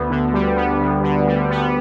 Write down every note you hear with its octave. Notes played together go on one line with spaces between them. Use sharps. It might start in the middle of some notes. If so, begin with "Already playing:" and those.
Already playing: D2 B3
D3
G3
B3
D2
D3
G3
B3